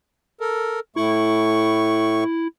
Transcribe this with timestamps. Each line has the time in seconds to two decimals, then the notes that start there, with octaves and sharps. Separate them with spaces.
0.41 A4 A#4
0.96 A2 A3 E4 C#6